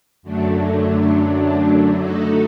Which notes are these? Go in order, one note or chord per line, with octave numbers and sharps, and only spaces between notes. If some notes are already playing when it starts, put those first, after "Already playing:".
F#2 D3 F#3 A3 D4
D3 A3 D#4 F#4 A4